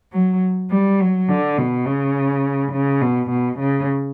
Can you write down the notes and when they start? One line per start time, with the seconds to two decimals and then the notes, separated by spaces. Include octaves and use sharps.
0.12 F#3
0.71 G3
1.00 F#3
1.29 D3
1.58 B2
1.86 C#3
2.72 C#3
3.01 B2
3.30 B2
3.59 C#3